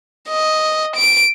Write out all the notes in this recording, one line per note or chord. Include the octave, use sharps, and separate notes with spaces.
D#5
D7